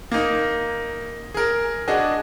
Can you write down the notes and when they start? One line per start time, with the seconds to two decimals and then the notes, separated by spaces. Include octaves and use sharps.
0.12 A#3 D#4
1.34 G#4 A#4
1.88 D4 F#4 G#4 D#5